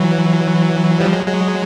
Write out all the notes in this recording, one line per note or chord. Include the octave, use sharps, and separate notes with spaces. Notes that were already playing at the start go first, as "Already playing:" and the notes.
Already playing: E3 F#3
F3 G3
F#3 G#3
F#3 G#3